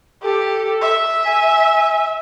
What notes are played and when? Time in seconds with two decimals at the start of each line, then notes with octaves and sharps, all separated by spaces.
0.23 G4 A4
0.81 E5
1.24 G#5